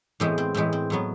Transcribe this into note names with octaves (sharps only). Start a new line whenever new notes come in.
A2 E3 G#3 B3 C4
C4
A2 E3 G#3 C4
C4
A2 F#3 B3